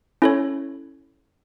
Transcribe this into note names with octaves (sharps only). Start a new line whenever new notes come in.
C#4 E4 A4 C#5